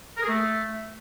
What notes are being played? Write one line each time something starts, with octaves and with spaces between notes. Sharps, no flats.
A#4
G#4
A3